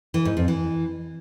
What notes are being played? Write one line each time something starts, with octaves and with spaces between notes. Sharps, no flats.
E3
G#2
F2
E3